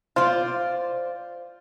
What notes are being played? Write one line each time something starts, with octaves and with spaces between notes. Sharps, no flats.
F4 C5 D5